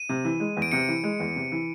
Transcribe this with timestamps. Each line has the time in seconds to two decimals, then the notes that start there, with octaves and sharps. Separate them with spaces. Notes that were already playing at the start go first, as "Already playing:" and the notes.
Already playing: D#7
0.09 C3
0.24 E3
0.40 G#3
0.57 E2
0.62 D7
0.72 C3 C#7
0.88 E3
1.03 G#3
1.20 E2
1.36 C3
1.52 E3